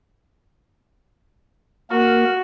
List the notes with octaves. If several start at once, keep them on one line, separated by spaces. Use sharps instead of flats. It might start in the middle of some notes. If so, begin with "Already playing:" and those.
A#3 F#4 A#4